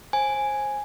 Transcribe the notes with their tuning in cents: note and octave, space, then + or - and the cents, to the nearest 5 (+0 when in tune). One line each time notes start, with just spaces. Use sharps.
C5 +25 G#5 +0